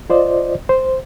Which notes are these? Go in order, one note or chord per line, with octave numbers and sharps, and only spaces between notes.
F4 C5 D5 D#5
C5